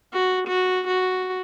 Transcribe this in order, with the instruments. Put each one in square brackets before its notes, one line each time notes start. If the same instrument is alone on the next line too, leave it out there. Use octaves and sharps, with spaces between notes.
[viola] F#4
F#4
F#4